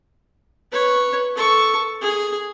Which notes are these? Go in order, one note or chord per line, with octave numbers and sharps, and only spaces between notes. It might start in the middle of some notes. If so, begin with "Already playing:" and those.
B4 C#5
A4 C#6
G#4